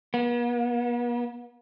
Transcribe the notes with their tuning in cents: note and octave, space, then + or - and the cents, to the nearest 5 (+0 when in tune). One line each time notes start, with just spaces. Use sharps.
B3 -45